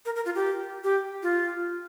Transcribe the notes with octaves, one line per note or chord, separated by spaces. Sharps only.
A#4
A#4
F4
G4
G4
F4